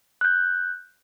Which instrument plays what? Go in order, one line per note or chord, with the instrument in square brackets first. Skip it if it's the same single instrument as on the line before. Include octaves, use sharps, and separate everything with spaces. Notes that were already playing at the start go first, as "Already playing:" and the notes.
[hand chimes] F#6 G6